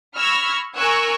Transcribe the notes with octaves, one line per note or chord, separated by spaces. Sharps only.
B5 C#6 E6 F6 G#6 A#6
A#4 G#5 C#6 E6 F#6 G#6